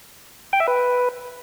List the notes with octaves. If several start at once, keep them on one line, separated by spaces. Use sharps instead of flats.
G5
E5
B4